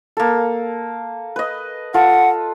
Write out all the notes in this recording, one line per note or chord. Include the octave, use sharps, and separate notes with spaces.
A#3 A4
B4 D#5
F4 A4 F#5